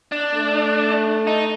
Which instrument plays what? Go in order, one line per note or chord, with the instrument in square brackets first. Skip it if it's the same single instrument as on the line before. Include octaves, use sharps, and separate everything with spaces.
[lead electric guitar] D4
[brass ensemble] A3
[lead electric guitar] D#4